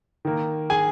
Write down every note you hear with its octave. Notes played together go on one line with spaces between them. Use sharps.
D#3 A#3
G#4 G#5